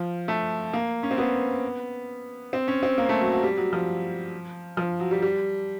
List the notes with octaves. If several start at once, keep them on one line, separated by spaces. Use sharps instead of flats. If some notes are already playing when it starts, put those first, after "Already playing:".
Already playing: F3
A3
A#3
C#4
C4
B3
C4
C#4
C4
A#3
A3
F#3
F#3
G3
F#3
F3
F3
F#3
G3
G3